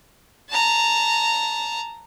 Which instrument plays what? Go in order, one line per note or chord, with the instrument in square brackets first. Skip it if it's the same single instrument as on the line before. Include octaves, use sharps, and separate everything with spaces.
[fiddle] A5 A#5